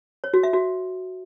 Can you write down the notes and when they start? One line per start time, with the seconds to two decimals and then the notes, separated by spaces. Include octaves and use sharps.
0.24 C#5
0.34 F#4
0.43 E5
0.53 F#4